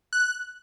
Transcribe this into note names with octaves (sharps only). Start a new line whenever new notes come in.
F#6